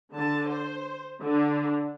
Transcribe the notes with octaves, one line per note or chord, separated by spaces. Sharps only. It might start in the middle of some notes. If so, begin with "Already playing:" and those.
D3 A5
C5
D3 D4